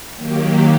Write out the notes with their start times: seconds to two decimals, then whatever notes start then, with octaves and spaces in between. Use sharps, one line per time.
0.16 D#3 F#3 A#3 G4